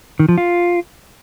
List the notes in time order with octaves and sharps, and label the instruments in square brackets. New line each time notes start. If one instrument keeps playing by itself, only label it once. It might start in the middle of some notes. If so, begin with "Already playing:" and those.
[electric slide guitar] D#3
F3
F4